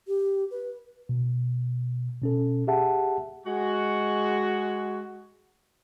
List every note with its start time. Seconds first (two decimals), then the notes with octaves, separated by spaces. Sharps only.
0.07 G4
0.51 B4
1.09 B2
2.21 B2 C#4 A4
2.67 G4 G#4 E5 F#5 A5
3.45 G#3 F#4